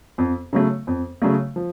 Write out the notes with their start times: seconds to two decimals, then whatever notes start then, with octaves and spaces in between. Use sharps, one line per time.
0.18 F2
0.53 C#3 F#3 A3
0.87 F2
1.22 C#3 F#3 A3
1.56 F3